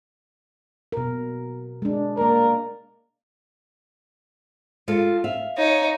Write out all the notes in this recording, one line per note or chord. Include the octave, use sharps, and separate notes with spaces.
B2 A#4
G#3 D4
A#3 A#4 D5
G#3 F4 A4
E5 F5
D#4 C#5